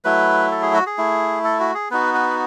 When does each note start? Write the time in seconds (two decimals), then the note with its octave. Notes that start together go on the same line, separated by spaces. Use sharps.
0.05 F#3 A3 E4 B4
0.51 A4
0.62 G#4
0.74 F#4
0.86 G#4
0.98 A3 E4
1.44 A4
1.60 F#4
1.75 G#4
1.90 B3 D#4 F#4 B4
2.14 B4